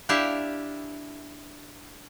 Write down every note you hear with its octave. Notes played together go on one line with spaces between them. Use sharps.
D4 E4 G4 E5 F5 A5